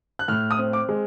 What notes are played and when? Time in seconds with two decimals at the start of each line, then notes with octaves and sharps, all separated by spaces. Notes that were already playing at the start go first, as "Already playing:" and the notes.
0.19 F#6
0.28 A2 F6
0.51 D#6
0.58 C4
0.73 D6
0.89 G#3